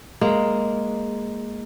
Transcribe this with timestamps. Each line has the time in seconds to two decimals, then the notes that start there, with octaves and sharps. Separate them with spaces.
0.21 G#3 A#3